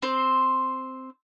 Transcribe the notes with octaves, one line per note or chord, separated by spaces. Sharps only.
C4 C5